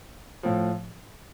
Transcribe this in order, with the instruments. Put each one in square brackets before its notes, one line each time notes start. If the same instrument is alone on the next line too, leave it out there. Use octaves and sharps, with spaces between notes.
[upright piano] A2 F3